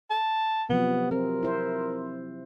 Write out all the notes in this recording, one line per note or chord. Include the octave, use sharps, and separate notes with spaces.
A5
C3 F3 F#3 B3
C4 A#4
E4 C5